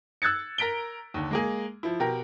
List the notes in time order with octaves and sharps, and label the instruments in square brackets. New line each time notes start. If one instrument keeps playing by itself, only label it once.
[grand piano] E6 F#6 G#6 A6 C#7
A#4 A#5 B6 D7 G7
D#2 D3
G#3 A#3 G#4
F3 E4
B2 G4 A#4